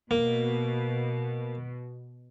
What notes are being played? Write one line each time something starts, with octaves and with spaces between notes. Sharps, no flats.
B2 A#3